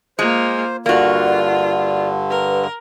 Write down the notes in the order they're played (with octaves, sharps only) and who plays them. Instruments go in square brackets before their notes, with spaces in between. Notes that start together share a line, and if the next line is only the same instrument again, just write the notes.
[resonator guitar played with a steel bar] G#3 [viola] A#3 F4 [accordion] C5
[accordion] G2 D3 [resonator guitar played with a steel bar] A#3 F#4 [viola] F4 [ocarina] D5
[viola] A#4 [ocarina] B4